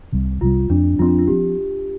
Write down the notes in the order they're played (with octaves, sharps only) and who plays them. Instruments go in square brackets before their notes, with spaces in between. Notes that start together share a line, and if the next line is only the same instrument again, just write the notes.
[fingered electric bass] C2 C3 G3
[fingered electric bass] C2 C3 G3 [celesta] F4
[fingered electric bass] F2 F3 A3 C4 [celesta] D4
[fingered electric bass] F2 F3 A3 C4 [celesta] F4
[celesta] D4
F4
[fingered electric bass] F3 A3 C4 [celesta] G4